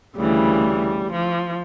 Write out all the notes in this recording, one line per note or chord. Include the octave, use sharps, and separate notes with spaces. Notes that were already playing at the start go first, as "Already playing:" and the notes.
D2 C#3 E3 G3
F3